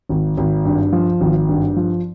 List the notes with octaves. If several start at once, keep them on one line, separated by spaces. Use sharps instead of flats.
G#1
G#1
G2
F3
G#1
G2
F3